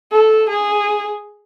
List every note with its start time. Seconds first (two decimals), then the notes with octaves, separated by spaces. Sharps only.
0.12 A4
0.49 G#4